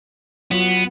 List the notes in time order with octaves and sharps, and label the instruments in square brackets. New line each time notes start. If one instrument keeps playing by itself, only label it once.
[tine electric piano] F#3 F4 F#4 [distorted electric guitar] B3